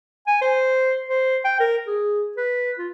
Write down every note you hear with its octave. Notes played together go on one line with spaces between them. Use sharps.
G#5
C5
C5
G5
A#4
G#4
B4
F4